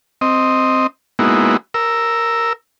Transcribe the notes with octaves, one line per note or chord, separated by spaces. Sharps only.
C4 D#5
G#3 A#3 B3 D#4 E4 F#4
A#4 E6